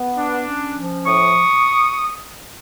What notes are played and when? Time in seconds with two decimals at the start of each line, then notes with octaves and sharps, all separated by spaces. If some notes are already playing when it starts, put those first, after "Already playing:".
Already playing: B3
0.17 D4
0.47 C#4
0.76 F3
1.05 A2 C#6 D#6